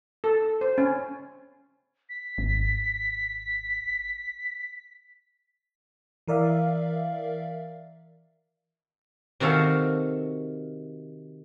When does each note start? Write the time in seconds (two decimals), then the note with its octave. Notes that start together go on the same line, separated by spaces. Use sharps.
0.24 A4
0.61 C5
0.78 C#4
2.09 B6
2.38 G#1
6.28 E3 A#4 D5 E5 F5
9.40 C3 D#3 F#4 A4 F5